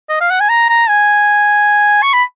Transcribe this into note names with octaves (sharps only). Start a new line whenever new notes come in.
D#5
F5
F#5
G#5
A#5
A#5
G#5
C#6
B5